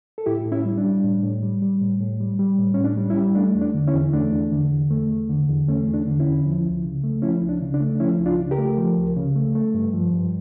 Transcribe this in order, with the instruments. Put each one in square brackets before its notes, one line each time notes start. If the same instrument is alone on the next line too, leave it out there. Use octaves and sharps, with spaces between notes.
[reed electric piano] A4
A2 E4 G4
A2
C#4 E4
G3
D4
G3
A2
A2
G3
G3
A2
A2
G3
G3
A2
A2 C#4
D4
G3
C#4 E4
G3
A3 D4
E2
D4
D3
C#4 E4
E2
A3 D4
E2
D3
E2
A3
E2
D3
E2
A3 C#4
E2
D4
D3
C#4 E4
E2
F3
C#2
C#3
A3
F3 C#4 E4
C#2
D4
C#3
D4
A3
F3 C#4 E4
C#2
D4 F4
C#3
G4 A#4
A3
F3
C#2
C#3
A3
A3
G2
F3
G2